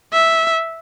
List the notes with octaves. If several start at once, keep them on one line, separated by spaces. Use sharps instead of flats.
E5